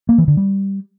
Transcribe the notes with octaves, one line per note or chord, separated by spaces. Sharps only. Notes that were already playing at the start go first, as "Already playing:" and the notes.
A#3
E3
D3
G3